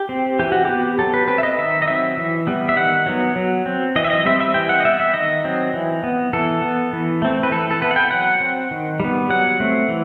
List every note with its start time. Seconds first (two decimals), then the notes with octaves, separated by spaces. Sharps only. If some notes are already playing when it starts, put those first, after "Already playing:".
Already playing: G4
0.09 C4
0.39 E3 G4
0.52 F#4
0.65 B3 G4
0.99 F#3 A4
1.14 B4
1.28 C4 B4
1.38 E5
1.43 D#5
1.58 D#3 E5
1.82 D#5
1.88 F#3 C4 E5
2.17 E3
2.47 G3 B3
2.69 E5
2.77 D#3 F#5
3.06 F#3 B3
3.36 F#3
3.66 C4
3.96 E3 D#5
4.04 E5
4.10 D#5
4.25 G3 C4 E5
4.40 E5
4.54 E3 G5
4.69 F#5
4.80 D#5
4.84 B3 E5
5.00 E5
5.14 D#3 D#5
5.44 F#3 C4
5.74 E3
6.04 B3
6.33 E3 A4
6.62 B3
6.93 E3
7.22 A3 C4
7.43 B4
7.52 E3 A4
7.71 A4
7.81 B3 B4
7.91 F#5
7.96 G5
8.11 F#3 F#5
8.40 C4
8.71 D#3
9.00 G3 B3
9.30 F#3 F#5
9.60 A3 C4
9.89 E3